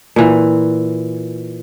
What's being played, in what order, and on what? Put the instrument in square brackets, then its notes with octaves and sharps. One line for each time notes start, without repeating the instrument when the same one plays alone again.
[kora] A#2 E3